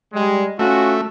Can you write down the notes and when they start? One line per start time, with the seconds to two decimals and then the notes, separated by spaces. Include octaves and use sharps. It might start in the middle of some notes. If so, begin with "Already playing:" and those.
0.13 G3 G#3
0.59 A3 C#4 F4 F#4